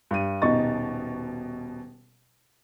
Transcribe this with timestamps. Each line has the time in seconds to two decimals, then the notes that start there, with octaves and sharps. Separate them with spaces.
0.11 G2 D#7
0.42 D#1 B2 D#4 D#5 C#6 A6